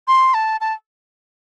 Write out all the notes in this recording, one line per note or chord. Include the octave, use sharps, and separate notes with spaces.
C6
A5
A5